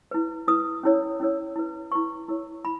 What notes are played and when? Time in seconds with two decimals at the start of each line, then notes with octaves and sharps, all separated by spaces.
0.11 E4 B4
0.48 E4 B4 D#6
0.83 C#4 E4 A#4 C#5
1.20 C#4 E4 A#4 C#5
1.56 E4 B4
1.92 E4 B4 C#6
2.28 E4 A#4 C#5
2.65 E4 B5